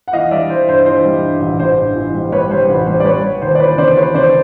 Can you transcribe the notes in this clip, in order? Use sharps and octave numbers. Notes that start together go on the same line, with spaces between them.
F#5
E3 D#5 F5
G3 D5 E5
E3 C5
G2 C5
E3 C5
G3
G2
A1
A1 C5
G2
E3
G3
G3 B4 C#5
G3 C5
A1 B4
G3 C5
D5
G3 B4 C#5
G3
D#2 C5
D5
E3 B4 C#5
C#3 C5 D5
E3 B4 C#5
C#3 C5 D5